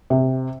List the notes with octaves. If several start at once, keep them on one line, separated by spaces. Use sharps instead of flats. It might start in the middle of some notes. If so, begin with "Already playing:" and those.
C3